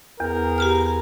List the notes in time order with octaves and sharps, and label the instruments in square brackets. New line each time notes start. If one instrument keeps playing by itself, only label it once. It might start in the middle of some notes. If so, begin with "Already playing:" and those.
[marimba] E2 [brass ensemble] B3 G#4 A#4
[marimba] G4 A#5 F6